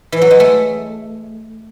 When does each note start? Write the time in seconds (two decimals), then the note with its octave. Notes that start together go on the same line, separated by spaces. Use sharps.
0.12 E3
0.21 F#3
0.31 G#3
0.40 A3